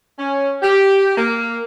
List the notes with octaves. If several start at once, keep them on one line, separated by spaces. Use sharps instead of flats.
C#4
G4
A#3